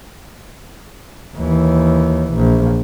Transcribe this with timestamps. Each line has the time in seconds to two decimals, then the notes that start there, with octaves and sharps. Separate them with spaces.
1.36 D#2 E3
2.34 A#1